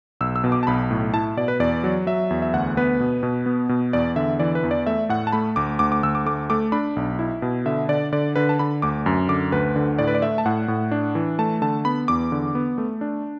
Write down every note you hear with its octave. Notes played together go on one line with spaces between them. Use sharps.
B1 E6
E6
B2
D6
A5
B1 B5
A2
E4 A5
B2 D5
B4
E2 D5
F#3
F#3 E5
E2
E5
D2 F#5
B3 B4
B2
B2
B3
B2
E2 D5
D3 E5
E3 D5
B4
E2
D5
A3 E5
A2 F#5
A5
A3 B5
D2 D6
D2 D6
D6
D2 E6
D6
A3 D6
A3 D6
D4 B5
B1
E4
B2
D3 E5
D3 D5
D3 D5
D3 B4
A5
D3 B5
D2 D6
F#2
D3 D6
D2 B4
D3
A2 D5
B4
D5
A3 E5
A5
A2 F#5
A2
D4
E3
A3 A5
D3 A5
B3 B5
E2 D6
D3
B3
A3
D4